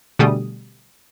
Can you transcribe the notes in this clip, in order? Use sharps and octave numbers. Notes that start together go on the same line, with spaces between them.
B2 D3 G3 A3 G#4 D#6